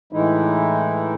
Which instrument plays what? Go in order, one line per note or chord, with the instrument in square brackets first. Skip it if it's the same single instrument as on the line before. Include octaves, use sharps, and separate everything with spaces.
[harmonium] A2 E3 G#3 D#4 E4